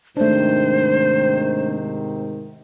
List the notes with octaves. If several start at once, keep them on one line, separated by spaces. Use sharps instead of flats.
G#2 C3 D#3 A3 D4 C5